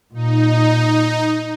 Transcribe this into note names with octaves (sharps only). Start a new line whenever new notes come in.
A#2 D#4